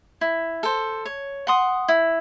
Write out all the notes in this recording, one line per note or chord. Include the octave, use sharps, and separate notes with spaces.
E4
A4 C5
C#5
F#5 C6 D#6
E4